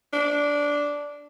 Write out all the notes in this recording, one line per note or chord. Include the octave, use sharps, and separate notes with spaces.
D4